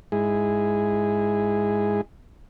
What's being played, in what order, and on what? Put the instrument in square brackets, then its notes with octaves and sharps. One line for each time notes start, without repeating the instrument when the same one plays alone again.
[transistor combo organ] G#2 G#3 E4 G#4